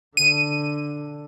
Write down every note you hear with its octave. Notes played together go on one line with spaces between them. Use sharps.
D3 D#7